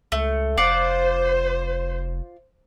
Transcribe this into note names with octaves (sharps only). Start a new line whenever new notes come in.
C#2 A3
F1 F4 C5 D5 F#5